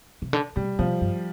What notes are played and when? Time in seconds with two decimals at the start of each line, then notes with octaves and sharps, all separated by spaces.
0.22 C3
0.33 D3
0.56 C3 G3
0.79 C3 F3
1.01 G2